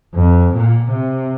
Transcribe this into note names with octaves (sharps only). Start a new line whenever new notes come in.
F2
A#2
C3